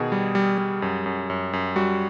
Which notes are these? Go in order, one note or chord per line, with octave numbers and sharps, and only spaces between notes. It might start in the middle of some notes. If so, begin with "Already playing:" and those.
Already playing: B2 D#3 G#4
G3
G3
G3
F#2
F#2
F#2
F#2
G3 F#4